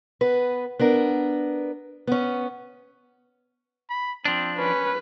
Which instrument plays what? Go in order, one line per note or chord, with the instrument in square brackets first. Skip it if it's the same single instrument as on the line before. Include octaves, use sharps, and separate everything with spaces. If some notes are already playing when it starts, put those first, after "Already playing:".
[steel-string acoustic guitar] B3 B4
B3 D4 A#4
B3 C#4
[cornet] B5
[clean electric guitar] F3 D4 [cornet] C4
[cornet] C#4 [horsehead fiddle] B4